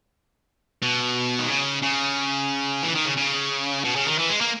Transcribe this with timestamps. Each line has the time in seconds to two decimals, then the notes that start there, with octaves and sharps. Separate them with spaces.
0.82 B2
1.39 D#3
1.49 C#3
1.82 C#3
2.83 E3
2.95 D#3
3.06 C#3
3.17 C#3
3.84 B2
3.96 C#3
4.06 D#3
4.18 E3
4.29 G#3
4.41 A#3